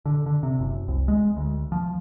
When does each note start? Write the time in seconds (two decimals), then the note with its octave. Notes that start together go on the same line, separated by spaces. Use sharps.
0.06 D3
0.26 D3
0.43 C3
0.59 F#1
0.88 C2
1.08 G#3
1.37 D2
1.72 F3